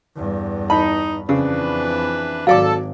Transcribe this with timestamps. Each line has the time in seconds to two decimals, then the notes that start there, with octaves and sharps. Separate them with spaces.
0.16 E2 G2
0.70 D#4 A5 B5
1.29 F2 C#3 E3 D4 B4
2.47 G#1 F#3 A4 D5 F5 D6